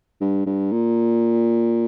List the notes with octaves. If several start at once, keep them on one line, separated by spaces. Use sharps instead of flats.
G2
G2
A#2